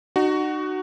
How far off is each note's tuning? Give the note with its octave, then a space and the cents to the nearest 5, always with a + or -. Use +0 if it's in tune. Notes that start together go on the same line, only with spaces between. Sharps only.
D#4 -35 F#4 +10